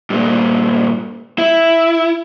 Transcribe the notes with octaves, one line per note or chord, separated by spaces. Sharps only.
G2 A#2
E4